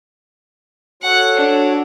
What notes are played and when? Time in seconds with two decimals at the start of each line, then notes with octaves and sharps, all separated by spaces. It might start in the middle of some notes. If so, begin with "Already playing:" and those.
1.03 F#4 A4 C#5 F#5
1.37 D4